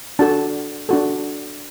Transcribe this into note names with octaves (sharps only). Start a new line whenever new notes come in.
D4 F#4 A4 A5
D4 F#4 A4